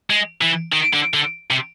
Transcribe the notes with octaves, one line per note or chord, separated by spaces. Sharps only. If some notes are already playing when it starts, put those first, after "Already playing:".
G#3
E3
D#3
D3
D3
C3